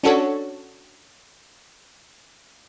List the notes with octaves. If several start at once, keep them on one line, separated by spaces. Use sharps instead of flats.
C#4 D4 F#4 A4 C#5